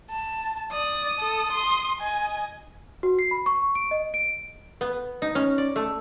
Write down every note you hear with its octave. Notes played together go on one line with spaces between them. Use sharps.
A5
D5 D#6
A4
C6
D#5 G#5
F#4
C7
B5
C#6
D7
D#5
D7
B3
D#4
C#4
D5
A3